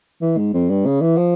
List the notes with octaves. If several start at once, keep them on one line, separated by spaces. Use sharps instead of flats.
E3
G#2
F2
G2
C#3
E3
F3